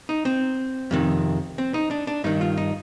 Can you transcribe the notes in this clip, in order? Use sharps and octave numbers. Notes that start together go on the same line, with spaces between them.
D#4
C4
F2 C3 D#3
C4
D#4
D4
D4
G2 D#3 D#4
F4
D#4